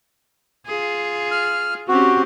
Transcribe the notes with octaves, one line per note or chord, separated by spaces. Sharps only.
F4 G#4
F6
C4 C#4 F#4 G4